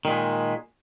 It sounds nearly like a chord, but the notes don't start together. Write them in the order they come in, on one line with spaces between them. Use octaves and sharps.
D#3 A#2 G#3